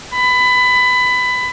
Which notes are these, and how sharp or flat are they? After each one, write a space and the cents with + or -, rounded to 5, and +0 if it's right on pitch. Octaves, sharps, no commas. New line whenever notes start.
B5 +20